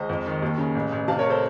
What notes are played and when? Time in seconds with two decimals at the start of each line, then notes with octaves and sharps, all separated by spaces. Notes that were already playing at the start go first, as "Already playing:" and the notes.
Already playing: C#2 C5 D#5
0.09 F2
0.26 D#3
0.42 D#2
0.58 C#3
0.75 A1
0.92 A1
1.08 C3 F5 A5
1.19 A#4 C#5
1.30 A4 C5